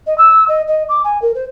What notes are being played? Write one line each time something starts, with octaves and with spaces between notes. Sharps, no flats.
D#5
E6
D#5
D#5
D6
G#5
A#4
C5